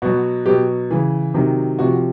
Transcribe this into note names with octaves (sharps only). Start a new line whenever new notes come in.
B2 F#3 F#4
B2 F#3 G4
C#3 E3
C3 D#3 F#3
C3 F3 F#4